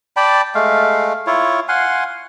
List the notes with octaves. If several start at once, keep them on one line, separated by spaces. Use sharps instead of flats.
D5 G5 A5 B5
G#3 A3 F5
E4 F4 C#5
F5 F#5 G#5 C6